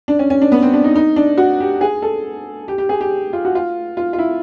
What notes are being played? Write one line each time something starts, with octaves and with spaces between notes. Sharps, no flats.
D4
C#4
C#4
D4
B3
C4
D4
D#4
D#4
D4
F#4
G4
G#4
A4
G4
G4
G#4
G4
F4
F#4
F4
F4
F4
E4